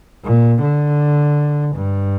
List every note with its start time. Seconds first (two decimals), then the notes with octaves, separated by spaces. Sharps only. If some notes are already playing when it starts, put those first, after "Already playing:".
0.24 A#2
0.61 D3
1.74 G2